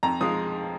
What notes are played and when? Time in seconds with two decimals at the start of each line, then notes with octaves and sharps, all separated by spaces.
0.03 F2 A#5
0.21 F3 G#3 D#6